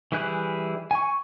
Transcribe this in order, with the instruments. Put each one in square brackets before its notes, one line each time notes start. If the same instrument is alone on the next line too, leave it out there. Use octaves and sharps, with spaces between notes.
[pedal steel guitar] E3 G3 E4 G#4 F#6
G#5 C#6